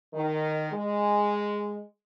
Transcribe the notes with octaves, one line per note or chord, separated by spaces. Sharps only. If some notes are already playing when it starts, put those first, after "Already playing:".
D#3
G#3